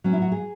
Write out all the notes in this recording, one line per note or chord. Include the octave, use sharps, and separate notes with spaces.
A2 F#3 C#4
E4
F#4
G#4